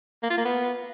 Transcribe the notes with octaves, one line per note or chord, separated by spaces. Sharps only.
A#3
F4
A#3
B3